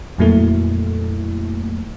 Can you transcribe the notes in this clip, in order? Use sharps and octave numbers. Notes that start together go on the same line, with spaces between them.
F2 A#2 F#3 A3 A#3 E4